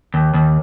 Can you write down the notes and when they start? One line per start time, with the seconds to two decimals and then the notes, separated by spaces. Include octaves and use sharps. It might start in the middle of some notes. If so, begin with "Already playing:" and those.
0.14 D#2
0.34 D#2